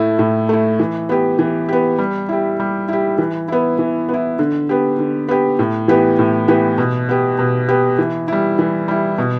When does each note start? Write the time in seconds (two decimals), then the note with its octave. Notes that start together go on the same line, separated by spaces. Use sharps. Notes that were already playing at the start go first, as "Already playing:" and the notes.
Already playing: A2 A3 E4
0.19 A2
0.49 A3 E4
0.79 E3
1.09 B3 G4
1.39 E3
1.69 B3 G4
1.98 G3
2.29 E4 G4
2.60 G3
2.88 E4 G4
3.18 E3
3.48 B3 E4
3.79 E3
4.09 B3 E4
4.39 D3
4.69 B3 G4
4.99 D3
5.29 B3 G4
5.59 A2
5.88 E3 B3 G4
6.19 A2
6.48 E3 B3 G4
6.78 B2
7.09 B3 G4
7.39 B2
7.69 B3 G4
7.99 E3
8.28 G3 E4
8.59 E3
8.88 G3 E4
9.18 B2